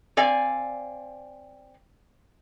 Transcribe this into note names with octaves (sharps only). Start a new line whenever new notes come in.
C4 D5 F5 G#5